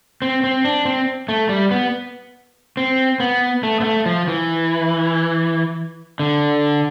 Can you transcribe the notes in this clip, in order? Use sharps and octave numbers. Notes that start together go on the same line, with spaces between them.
C4
C4
D4
C4
A3
G3
B3
C4
B3
A3
B3
A3
F3
E3
D3